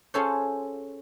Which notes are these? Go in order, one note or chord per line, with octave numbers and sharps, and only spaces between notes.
C#4 F4 G#4 A4 C5 C#5